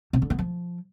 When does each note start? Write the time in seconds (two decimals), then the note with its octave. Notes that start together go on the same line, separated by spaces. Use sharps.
0.13 C3
0.22 D3
0.30 B3
0.39 F3